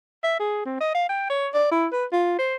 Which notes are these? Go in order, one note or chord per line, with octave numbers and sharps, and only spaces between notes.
E5
G#4
C4
D#5
F5
G5
C#5
D5
E4
B4
F4
C5